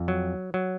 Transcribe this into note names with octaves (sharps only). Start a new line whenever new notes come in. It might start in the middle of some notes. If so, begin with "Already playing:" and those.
Already playing: F2
F#3
F#3